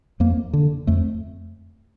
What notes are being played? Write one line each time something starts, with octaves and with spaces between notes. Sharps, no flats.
F2 A#3
D3
F2 A3